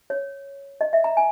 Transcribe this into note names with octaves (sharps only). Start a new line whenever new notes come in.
C#5
D#5
E5
A#5
G#5